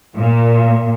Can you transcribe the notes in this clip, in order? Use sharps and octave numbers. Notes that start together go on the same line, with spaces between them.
A#2